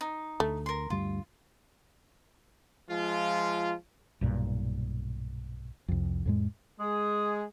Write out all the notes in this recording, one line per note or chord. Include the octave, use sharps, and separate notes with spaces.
D#4
D2 A3
A#4 C6
D2 G2 G3 F4
F3 G#3 F4
B1 G2 A#2
C2 F2
F2 A2 G#3
G#3 G#4 D#6